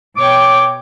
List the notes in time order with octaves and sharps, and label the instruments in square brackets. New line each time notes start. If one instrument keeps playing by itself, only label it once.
[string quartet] B2 C#5 G5 [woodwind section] D6